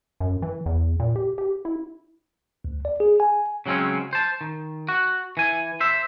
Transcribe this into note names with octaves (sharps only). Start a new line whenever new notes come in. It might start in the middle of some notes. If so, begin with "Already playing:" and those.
F#2
E3
E2
A#2
G4
G4
E4
D2
D5
G#4
G#5
C#3 F#3 G#3 C4 C#4
C5 A5
D#3
F#4
E3 G#5
C5 E5